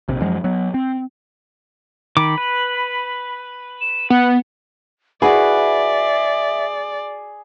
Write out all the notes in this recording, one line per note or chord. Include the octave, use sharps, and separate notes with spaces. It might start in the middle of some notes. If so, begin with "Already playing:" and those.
A#1 C3
F#2 F3 F#3 G#3
F#3 B3
C4
D#3 B5 D6
B4
E7
B3 F#5
E4 F#4 G#4 B4 D5 E5